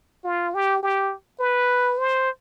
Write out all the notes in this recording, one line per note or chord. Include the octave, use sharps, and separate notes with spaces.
F4
G4
G4
B4
C5